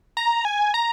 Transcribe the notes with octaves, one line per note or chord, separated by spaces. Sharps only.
A#5
G#5
A#5